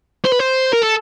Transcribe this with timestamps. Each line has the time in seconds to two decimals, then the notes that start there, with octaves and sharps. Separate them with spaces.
0.25 C5
0.32 B4
0.39 C5
0.72 A#4
0.82 A4